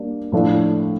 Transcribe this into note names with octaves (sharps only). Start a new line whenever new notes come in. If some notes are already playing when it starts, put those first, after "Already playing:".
Already playing: G3 A#3 D4
A2 F3 A3 D4